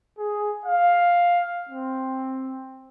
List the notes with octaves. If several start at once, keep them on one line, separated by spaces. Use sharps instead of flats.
G#4
F5
C4